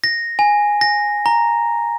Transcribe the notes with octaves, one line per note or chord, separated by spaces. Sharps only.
A#6
G#5
A#6
A#5